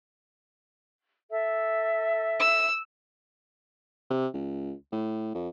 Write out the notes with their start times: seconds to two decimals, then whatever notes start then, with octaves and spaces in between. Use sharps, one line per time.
1.31 A4 E5
2.39 E6
4.10 C3
4.34 C#2
4.92 A2
5.34 F2